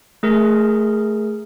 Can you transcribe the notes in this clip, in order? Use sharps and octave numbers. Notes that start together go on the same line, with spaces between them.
A3 G#4 A#4